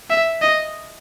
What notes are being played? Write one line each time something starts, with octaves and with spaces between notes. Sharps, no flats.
E5
D#5